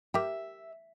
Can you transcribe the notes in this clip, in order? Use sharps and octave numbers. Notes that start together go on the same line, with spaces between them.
G4 A#4 E5 G5